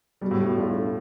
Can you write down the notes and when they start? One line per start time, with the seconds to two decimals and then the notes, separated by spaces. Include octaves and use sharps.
0.21 B2 G3
0.31 A2
0.40 B2
0.57 A2 D4 F4 A4